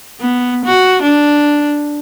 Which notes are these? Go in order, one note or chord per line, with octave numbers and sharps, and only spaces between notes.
B3
F#4
D4